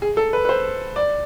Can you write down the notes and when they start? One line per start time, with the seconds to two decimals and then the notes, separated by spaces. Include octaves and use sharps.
0.02 G#4
0.17 A4
0.33 B4
0.45 B4
0.49 C5
0.96 D5